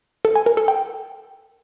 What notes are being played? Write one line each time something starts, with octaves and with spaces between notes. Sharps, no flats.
A4
G#5
A#4
A4
G5